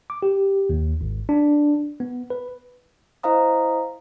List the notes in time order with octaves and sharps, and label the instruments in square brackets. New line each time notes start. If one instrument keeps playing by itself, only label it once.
[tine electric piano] D6
G4
D#2
G#1
D4
B3
B4
[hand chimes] E4 C5 D#5 F5 A#5 D#6